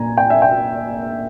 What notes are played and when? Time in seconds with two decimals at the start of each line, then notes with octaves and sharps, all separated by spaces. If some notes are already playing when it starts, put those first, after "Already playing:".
Already playing: A#2 G#5 A#5
0.18 G5
0.30 E5
0.42 G5